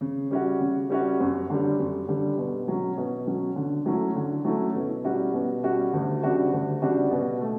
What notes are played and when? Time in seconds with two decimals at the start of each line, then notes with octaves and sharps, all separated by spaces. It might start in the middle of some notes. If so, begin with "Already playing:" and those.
0.01 C#3
0.31 G3 C#4 F#4
0.60 C#3
0.90 G3 C#4 F#4
1.20 F#2
1.50 D3 G3
1.79 F#2
2.08 D3 G3
2.37 B2
2.68 F#3 C#4
2.97 B2
3.27 F#3 C#4
3.56 D3
3.86 F#3 A3 C#4 E4
4.16 D3
4.45 F#3 A3 C#4 E4
4.75 B2
5.04 G3 C#4 F#4
5.34 B2
5.63 G3 C#4 F#4
5.93 D2
6.23 C#3 G3 D4 F#4
6.52 D2
6.81 C#3 G3 D4 F#4
7.11 B2
7.41 A3